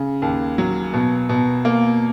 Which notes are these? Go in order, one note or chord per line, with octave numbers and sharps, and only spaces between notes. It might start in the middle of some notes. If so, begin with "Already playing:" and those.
Already playing: C#3
D#2
F#3
B2
B2
A#3